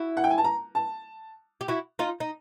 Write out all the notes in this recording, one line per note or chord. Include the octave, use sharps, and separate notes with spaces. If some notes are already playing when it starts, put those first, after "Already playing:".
Already playing: E4 F#4
F#5
G5
G#5
A5
A#5
A5
G4
E4 F#4
D#4 F4
D#4